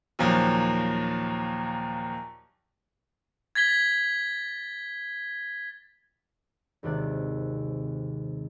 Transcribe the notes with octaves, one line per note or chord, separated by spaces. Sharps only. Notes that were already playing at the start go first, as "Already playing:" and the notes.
D#2 A#2 F3 F#3
G#6 A6 B6 G7
G#1 D#2 C3 D5 F#5 A6